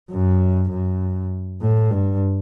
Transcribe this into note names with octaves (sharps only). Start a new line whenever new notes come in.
F#2
F#2
A2
G2